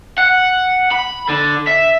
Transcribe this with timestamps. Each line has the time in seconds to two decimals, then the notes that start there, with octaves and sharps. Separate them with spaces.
0.18 F#5
0.91 B5
1.29 D3
1.67 E5